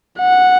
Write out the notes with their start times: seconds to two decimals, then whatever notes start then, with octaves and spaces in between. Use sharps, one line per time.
0.19 F#5